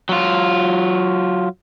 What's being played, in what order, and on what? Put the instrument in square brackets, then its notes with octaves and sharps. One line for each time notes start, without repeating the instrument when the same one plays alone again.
[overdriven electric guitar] F#3 F4